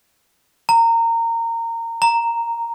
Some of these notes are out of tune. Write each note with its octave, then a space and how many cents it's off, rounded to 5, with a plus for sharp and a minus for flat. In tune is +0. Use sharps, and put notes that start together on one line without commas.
A#5 -20
A#5 -5